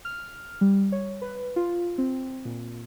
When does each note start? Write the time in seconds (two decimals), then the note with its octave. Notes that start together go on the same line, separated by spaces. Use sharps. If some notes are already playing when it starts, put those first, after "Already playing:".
0.05 F6
0.61 G3
0.92 C#5
1.22 B4
1.56 F4
1.98 C4
2.45 A#2